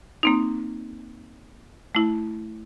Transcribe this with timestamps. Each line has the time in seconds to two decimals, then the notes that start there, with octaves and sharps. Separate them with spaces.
0.23 A#3 C4 D#4
1.95 A3 E4